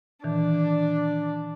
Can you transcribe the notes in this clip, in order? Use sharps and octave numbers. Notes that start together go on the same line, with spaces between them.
A#2 D#3 E3 D4